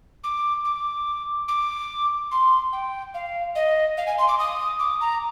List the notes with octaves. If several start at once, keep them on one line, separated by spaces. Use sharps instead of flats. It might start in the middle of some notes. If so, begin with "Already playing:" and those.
D6
D6
D6
C6
G5
F5
D#5
F5
G#5
C6
D6
D#6
D6
A#5